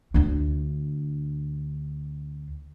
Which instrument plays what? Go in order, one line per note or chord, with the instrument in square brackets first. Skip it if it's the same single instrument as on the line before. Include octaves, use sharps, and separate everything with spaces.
[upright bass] D2 D4